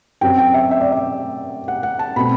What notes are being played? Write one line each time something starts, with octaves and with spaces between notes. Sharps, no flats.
F#2 F#3 C4 G5
G5
E5
E5
D5
E5
F#5
F#5
A5
B2 A3 C4 B5